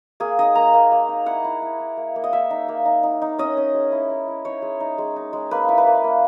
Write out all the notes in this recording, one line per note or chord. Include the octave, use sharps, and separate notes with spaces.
A#3 G#4
D#4 D#5
A#3 A#5
A#3
A#3
D#4
E4 F#5
E4
E4
E4
A#3
A#3
D#5
A#3 E5
D#4
A#3
D#4
D#4
D#4
C#4 D#5
C#4
G#3
E4
E4
E4
D#4 C#5
G#3
D#4
G#3
D#4
G#3
A#3 B4
E4
B4
A#3
A#3